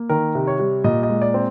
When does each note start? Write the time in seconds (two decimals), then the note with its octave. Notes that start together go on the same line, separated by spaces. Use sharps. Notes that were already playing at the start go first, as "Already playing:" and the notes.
Already playing: A#3
0.09 D#3 A#4
0.35 C3
0.47 C#5
0.59 G3
0.84 A#2 D#5
1.03 D#5
1.10 G#3
1.21 D5
1.34 C4